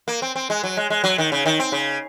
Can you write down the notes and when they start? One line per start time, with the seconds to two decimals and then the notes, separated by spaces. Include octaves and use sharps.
0.08 A#3
0.22 C4
0.36 C4
0.50 G#3
0.63 F#3
0.77 G#3
0.90 G#3
1.04 F#3
1.18 D#3
1.32 C#3
1.46 D#3
1.60 C4
1.72 C#3